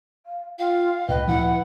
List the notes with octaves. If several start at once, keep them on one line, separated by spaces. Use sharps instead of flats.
F5
F4 F5 G5
C#2 A#2 B4 D#5 G5
D2 A#2 F3 E4 F#5